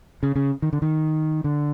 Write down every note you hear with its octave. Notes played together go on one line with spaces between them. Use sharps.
C#3
C#3
D#3
D3
D#3
D3